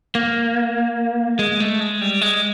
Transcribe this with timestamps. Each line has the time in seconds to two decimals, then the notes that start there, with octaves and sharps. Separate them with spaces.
0.15 A#3
1.39 G#3
1.60 A3
1.81 G#3
2.01 G3
2.21 G#3